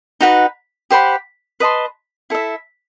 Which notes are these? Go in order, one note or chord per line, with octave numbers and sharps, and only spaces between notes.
D#4 F#4 B4 F#5
G4 C5 F#5 B5
B4 D#5 A5 C6
E4 A4 E5